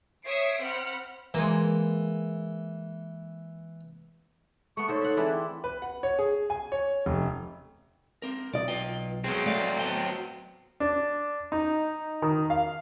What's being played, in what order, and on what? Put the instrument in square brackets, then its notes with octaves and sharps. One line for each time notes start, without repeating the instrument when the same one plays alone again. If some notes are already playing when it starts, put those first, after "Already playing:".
[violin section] C#5 E5 D#6 C7 D7
C4 F#5 B5 F6
[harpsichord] E3 [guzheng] G#3 A#3
[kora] A3 B3 [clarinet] C#6
[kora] D3 C5 [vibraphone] D#4 C#5 [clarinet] A4
[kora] E5 F#5
[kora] E3 D4 E4 [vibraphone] C4 G#4 E5
[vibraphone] G5 C6 D6
[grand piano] B4
F#5
C#5
G#4
G#5
C#5
F1
[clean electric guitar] C4 A#4
[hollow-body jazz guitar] B1 D#5 [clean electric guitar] D5
[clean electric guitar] F4 B4 G5
[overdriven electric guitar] F#3 C4 [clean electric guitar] B3 G#4
[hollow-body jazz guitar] A3 [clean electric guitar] D5 F5
[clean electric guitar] B3 G5
[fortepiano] D4
D#4
D#3
F5